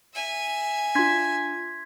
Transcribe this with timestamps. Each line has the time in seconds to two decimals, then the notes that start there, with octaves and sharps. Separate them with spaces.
0.14 E5 G#5
0.95 D4 F4 C6 G#6 B6